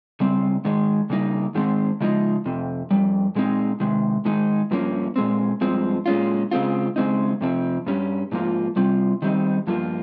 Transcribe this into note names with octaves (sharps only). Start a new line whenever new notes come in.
C#3 G3 C4
G#2 D#3 G#3
C#3 G3 A#3 D#4
G#2 D#3 G#3 C4
C#3 F3 G#3 D#4
F2 C3
F2 C3 G3
A#2 G#3 C4 D#4
C3 D#3 G#3
G#2 D#3 G#3 D#4
G2 F3 A#3 C#4
A#2 G#3 C4
G2 F3 G#3 C4
A#2 G#3 C#4 F4
C#3 G#3 C4 F4
C#3 G#3 C4 D#4
F2 C3 F3 C4
G2 G3 C#4
G#2 F3 A#3 F4
C3 G3 C4 F4
D#3 G3 C4 D#4
G2 F3 A#3 F4